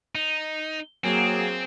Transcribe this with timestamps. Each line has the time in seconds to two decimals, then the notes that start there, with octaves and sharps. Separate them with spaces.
0.15 D#4
1.04 F#3 A#3 C4 G#4